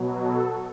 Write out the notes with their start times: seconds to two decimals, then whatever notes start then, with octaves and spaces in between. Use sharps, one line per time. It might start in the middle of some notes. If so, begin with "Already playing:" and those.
Already playing: B2 F#3
0.21 A4